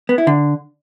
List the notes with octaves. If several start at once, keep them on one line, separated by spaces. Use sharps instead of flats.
B3
E4
D3